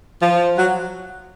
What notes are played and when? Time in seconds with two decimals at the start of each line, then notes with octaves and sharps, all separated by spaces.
0.22 F3
0.57 F#3